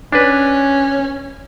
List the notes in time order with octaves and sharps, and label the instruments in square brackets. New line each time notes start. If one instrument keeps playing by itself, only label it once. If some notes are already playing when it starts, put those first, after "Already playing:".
[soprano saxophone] C#4 [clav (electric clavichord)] D4 B4